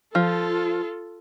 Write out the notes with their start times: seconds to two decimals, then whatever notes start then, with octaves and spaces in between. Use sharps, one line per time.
0.15 F3 F4 A4